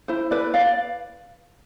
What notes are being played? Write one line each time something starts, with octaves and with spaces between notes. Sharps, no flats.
E4 C5
B4 D5
B4 D5 F5